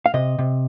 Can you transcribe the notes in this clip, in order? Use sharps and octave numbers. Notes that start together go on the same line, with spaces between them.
F5
C3 D#5
C3